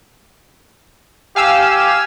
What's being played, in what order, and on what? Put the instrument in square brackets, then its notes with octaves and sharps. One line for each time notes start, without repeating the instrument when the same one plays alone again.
[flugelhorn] G4 [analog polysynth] F5 G#5 E6